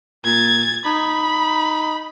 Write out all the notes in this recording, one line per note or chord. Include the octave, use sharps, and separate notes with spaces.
A#2 G#6 A6
D#4 B5